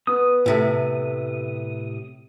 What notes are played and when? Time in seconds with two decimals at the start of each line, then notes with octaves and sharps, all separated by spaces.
0.07 B3 D#6
0.46 A2 C3 A3